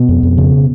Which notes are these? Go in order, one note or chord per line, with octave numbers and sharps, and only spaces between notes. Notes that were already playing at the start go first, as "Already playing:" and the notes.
Already playing: B2 B3
F2
F2
C#3